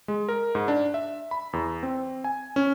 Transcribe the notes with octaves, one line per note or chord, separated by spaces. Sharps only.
G#3
A#4
G#2
D4
E5
B5
E2
C4
G#5
C#4